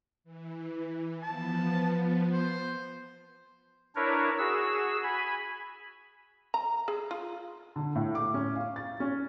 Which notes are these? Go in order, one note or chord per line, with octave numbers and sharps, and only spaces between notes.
E3
F3 B3 A5
C5
D4 E4 A#4 B4 C#5
F#4 G#4 E6
G#5 B5
A#5
G#4
F4
D3
A2
D6
C#4
F5
A6
C#4